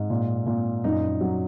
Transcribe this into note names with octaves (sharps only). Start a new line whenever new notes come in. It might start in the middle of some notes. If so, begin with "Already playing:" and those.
Already playing: G#2
A#2
A#2
F#2 D#4
F#3